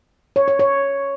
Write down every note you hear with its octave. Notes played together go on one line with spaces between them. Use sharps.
C#5
C#5
C#5